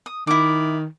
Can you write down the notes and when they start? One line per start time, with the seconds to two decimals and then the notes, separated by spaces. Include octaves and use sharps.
0.06 D#6
0.27 D#3 E4 D6